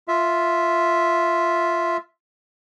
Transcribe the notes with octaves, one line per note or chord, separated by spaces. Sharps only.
F4 E5